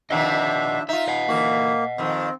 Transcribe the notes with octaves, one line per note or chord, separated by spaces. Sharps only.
C3 D#3 F3 D4 D#5 E5 F#5
D#4 F4 E5
D#5 F#5
D3 E3 A#3 F#4
F2 D#3 C4